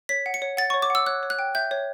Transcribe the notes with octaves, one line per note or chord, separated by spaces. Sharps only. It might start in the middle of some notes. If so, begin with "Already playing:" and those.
C#5 B6
F#5
C#7
C#5
F#5 A6
C#5 C#6
D6
F#5 E6
C#5 F#6
C#5
F#6
G5
E5 G6
C#5